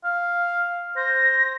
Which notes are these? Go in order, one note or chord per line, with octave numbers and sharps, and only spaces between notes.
F5
C5 A#6